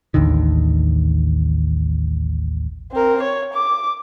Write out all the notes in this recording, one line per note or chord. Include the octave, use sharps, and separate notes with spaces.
A1 D#2 D3 D#3
C4 A#4
C#5
D6